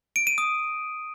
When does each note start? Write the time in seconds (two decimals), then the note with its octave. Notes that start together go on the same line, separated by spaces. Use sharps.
0.16 D7
0.27 D#7
0.38 D#6